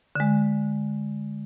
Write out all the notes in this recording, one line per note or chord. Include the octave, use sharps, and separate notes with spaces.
D3 G#3